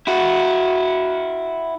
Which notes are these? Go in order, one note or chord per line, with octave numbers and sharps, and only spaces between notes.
E4 F#4